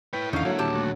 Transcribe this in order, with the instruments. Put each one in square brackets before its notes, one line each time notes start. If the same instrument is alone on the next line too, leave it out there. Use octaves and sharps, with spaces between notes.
[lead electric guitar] E4 C#5 [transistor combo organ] B4 G5
[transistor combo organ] E2 D#3 C#4 [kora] D3 [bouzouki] D#4 F5
[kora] F#3 F#5 [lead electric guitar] A#3 A4 [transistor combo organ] E4
[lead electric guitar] D#2 A#2 [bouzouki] G4 A5
[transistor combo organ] A3 F#4